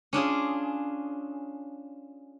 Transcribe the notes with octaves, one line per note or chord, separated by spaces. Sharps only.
C#4 D4 F4 G#4